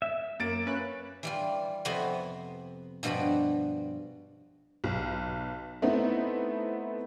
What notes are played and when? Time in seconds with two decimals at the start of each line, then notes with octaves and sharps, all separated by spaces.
0.02 E5
0.40 F#2 A#3 A6 D7
0.67 C#4 B4 F#6
1.23 E3 G3 F4
1.85 F2 C3 B3 F#4 B4 C6
3.03 G2 B2 F3 F#4 D5 B5
4.84 B1
5.82 A3 B3 C4 D#4 E4